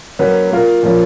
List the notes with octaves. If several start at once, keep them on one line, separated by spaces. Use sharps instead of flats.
F#3 A#3 C#4 F#4 B4
A#3 F4 A#4
A#2 F3 A#3 C#4 F4